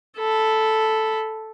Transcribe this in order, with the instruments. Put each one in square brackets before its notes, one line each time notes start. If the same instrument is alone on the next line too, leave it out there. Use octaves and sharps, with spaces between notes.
[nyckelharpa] A4 B5